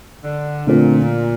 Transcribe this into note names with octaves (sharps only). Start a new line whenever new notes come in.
D3
A#2 D3 A3 C4 F4